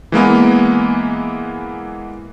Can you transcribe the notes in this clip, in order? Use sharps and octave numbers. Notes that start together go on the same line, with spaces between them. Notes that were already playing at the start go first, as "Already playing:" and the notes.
E3 G#3 A#3 B3